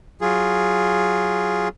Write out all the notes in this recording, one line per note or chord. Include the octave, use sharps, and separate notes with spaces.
F#3 F4 G#4